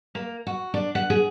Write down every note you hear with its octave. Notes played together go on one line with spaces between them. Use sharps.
A#3
F#4
D4
F#5
G#4